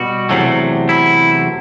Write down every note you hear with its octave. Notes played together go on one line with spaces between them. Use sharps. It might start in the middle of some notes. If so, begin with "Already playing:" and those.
Already playing: B2 G3 F#4
E2 C3 F#3 A3
E4